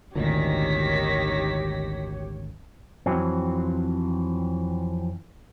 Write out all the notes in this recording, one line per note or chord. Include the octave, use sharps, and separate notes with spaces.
G#1 D2 A#2 D#3 G4 C#5 A#6 B6
F2 E3 F#3 C4